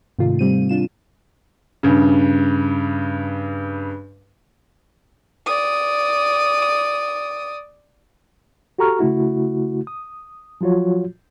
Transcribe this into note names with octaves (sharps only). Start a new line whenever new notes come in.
G#2 C3 D#3 A3 F4
G3 C4 D#7
D4 F4 E7
G2 C#3
D5 D#6
F#4 G4 A4 A#5 C#6 F6
C#3 A3 E4 F#4
D#6
F3 F#3 F4 F#4 C#5